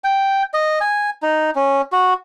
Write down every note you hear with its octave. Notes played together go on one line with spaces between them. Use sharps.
G5
D#5
G#5
D#4
C#4
F#4